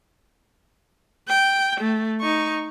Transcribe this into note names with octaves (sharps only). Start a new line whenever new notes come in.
G5
A3
D#4 C#6